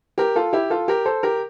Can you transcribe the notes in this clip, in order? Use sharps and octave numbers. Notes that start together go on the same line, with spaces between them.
G4 A#4
F4 A4
E4 G4
F4 A4
G4 A#4
A4 C5
G4 A#4